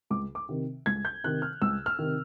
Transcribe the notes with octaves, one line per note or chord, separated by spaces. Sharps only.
C#2 D6
D6
C3 D#3
C#2 G#6
G6
C3 D#3 F#6
F6
C#2 E6
F6
C3 D#3